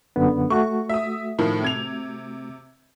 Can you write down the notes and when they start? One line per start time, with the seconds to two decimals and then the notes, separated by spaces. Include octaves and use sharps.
0.16 F#2 D3 B3
0.50 A3 F#4 C#6
0.89 E5 D#6
1.39 A2 D#3 F3
1.62 C3 G#6 F7